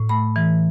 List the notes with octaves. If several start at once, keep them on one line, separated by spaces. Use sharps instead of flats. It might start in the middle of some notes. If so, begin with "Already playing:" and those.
Already playing: A2
A3 B5
E3